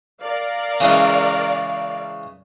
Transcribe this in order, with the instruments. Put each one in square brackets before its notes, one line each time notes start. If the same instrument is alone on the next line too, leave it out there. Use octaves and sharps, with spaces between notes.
[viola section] A#4 D5 F5
[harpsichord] C#3 E3 G#3